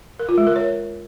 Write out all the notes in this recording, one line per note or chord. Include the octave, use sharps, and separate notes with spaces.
A#4
F4
G#3
A#4
C#5